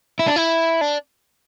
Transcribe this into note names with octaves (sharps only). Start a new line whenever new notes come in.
E4
D4
E4
D4